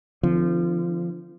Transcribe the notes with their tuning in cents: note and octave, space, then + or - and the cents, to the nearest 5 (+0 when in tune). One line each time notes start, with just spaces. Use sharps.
D3 +15 F3 -25 C4 -30